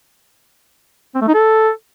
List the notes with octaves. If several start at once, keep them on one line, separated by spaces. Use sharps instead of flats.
C4
A3
D#4
A4